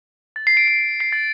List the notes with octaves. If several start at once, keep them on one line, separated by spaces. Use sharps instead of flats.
A6
C7
D7
C7
C7
A6